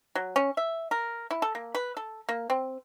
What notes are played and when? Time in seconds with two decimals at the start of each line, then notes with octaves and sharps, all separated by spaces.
0.15 F#3
0.36 C#4
0.57 E5
0.91 A#4
1.31 E4
1.42 A4
1.55 A#3
1.75 B4
1.97 A4
2.29 A#3
2.50 C4